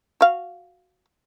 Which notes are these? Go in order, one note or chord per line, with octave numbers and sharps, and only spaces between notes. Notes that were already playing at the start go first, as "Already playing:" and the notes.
F#4 F5